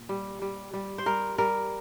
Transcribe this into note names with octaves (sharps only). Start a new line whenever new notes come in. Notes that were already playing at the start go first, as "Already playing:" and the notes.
Already playing: A#2
G3
G3
G3
C5
G3 A#4
G3 A#4